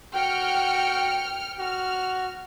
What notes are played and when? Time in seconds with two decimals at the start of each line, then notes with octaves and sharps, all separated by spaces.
0.15 F#4 G5 F6 C#7
1.59 F#4 F6